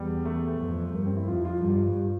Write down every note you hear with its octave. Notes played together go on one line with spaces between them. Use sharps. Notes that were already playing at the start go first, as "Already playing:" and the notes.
Already playing: E2 G3
A3
F2
G2 A#3
C4
E4
F2 F4
F4
G2 F4